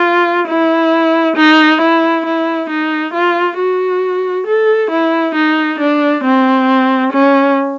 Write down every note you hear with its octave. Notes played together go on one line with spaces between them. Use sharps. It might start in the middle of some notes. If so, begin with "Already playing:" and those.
Already playing: F4
E4
D#4
E4
E4
D#4
F4
F#4
A4
E4
D#4
D4
C4
C#4